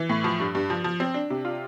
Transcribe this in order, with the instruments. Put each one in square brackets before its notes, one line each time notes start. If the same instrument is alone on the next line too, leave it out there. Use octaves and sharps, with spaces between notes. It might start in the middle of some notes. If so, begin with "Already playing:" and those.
Already playing: [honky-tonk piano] E3
A2
F3
G2
G2
F3
F3
C4
D4
C3
F4